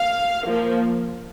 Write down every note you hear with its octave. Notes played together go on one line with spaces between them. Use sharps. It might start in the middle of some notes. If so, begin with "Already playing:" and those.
Already playing: F5
F3 A#3